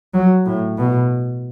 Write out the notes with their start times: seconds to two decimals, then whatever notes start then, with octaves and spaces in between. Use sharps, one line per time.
0.14 F#3
0.46 A2
0.78 B2